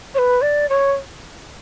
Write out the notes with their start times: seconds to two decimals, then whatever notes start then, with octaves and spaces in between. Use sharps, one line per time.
0.15 C#5
0.18 B4
0.42 D5
0.69 C#5